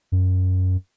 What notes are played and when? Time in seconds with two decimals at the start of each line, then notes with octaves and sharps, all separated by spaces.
0.12 F#2